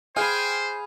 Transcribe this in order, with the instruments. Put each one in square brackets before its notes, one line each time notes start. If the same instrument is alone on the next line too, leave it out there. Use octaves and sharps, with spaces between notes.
[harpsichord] G#4 [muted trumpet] C5 [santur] F5 B5 [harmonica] G5 G#5